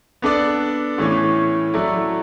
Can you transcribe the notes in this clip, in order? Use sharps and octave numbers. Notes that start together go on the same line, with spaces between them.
B3 D4 A4 D5
A2 E3 A3 C#4
F#3 A3 E4 A4 D5